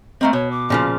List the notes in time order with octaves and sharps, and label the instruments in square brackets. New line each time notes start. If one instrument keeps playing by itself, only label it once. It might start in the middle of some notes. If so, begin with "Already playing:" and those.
[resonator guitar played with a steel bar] A3 A#3 C4 [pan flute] D#5
[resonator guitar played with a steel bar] B2 [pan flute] C#5
[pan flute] D6
[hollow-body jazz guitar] A#2 C#3 F3